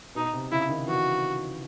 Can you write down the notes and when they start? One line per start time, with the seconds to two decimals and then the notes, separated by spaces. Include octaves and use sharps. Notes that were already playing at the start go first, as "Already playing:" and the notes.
0.15 B2 D#4
0.33 C3
0.52 C#3 E4
0.69 D#3
0.88 E3 F#4